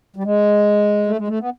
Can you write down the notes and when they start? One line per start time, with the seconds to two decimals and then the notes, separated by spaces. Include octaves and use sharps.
0.16 G3
0.24 G#3
1.06 A3
1.17 G#3
1.28 A3
1.39 B3